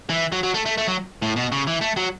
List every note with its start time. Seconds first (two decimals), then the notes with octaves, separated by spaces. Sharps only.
0.09 E3
0.32 F#3
0.43 F#3
0.54 A3
0.65 A3
0.77 A3
0.88 F#3
1.22 A2
1.36 B2
1.52 C#3
1.67 E3
1.81 A3
1.97 F#3